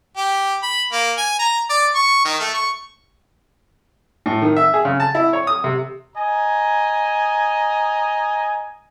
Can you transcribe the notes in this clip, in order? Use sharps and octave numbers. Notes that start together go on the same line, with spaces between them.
G4
B5
A#3
G#5
A#5
D5
C#6
D#3
A3
C#6
A2
D#3
E5
G#4
C#3
A5
E4
C#5
D#6
C3
D#5 G#5 A#5